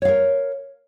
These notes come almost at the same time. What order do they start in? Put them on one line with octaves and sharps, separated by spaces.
C#5 F5 A#4